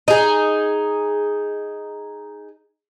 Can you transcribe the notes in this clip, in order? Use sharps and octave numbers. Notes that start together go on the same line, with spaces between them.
D#4 G#4